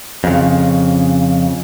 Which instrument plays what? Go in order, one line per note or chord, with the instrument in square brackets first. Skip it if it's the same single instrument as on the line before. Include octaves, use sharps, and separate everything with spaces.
[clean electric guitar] F2 C#3